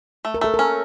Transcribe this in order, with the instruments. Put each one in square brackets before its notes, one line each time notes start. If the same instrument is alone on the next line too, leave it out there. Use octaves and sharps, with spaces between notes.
[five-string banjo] A3
[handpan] A#4
[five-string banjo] A3 [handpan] A4
[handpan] A#4
[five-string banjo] C#4